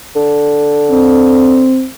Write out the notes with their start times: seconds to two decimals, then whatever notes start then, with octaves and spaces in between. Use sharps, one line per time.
0.16 D3
0.91 C4